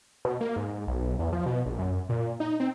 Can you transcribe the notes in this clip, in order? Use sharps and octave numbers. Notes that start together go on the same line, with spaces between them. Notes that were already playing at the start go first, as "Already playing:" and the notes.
B2
A#3
G#2
B1
E2
F3
B2
A#1
F#2
A#2
D#4
C4